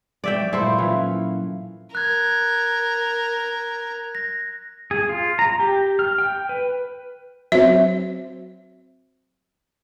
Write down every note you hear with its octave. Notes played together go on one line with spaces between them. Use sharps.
F#3 D5 E5 G5
A#2 E4 A4 C5
E3 C#4 F4
A#4 F#6 G#6
A#6
G#4
F4
A#5
G4
F6
G5
B4
F#3 C4 E5